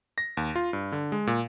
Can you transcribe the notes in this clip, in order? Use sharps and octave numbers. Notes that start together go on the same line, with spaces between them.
A#6
D#2
F4
G2
D3
G#3
A#2